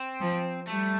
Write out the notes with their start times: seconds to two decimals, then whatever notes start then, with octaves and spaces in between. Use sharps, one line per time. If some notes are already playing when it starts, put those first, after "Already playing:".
Already playing: C4
0.21 F3
0.67 G3 A3